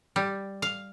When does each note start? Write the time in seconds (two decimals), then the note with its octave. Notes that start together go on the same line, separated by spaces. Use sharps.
0.16 G3
0.62 F5